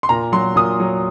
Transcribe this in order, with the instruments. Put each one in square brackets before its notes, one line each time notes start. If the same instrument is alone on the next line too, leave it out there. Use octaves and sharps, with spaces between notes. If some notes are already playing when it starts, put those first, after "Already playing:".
[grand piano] C6
A#2 A#5
F#3 C6
A#2 D#6
F#3